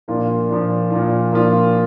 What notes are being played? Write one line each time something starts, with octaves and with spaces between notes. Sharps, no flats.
A#2 F3 A#3 D4 F4
A#2 F3 A#3 D4 F4
A#2 F3 A#3 D4 F4
A#2 F3 A#3 D4 F4